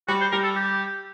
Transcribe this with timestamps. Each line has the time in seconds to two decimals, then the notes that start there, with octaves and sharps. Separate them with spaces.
0.08 G3 F#4
0.21 C5
0.32 G3 A#4
0.43 A4
0.56 G4